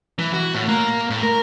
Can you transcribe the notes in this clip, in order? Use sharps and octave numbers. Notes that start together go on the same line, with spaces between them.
E3
F#4
A2
A#3
A2
A#4